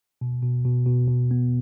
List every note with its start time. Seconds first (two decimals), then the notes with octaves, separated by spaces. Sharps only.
0.21 B2
0.43 B2
0.65 B2
0.86 B2
1.08 B2
1.31 B3